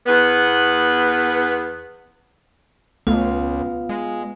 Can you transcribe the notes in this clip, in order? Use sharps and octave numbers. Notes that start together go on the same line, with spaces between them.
E2 B3
C#2 A3 B3 F4 F5
G#3